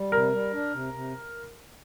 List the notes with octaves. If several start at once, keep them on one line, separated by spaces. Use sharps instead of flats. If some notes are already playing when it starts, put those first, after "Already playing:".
Already playing: G3
C3 A#4
G3
D4
C3
C3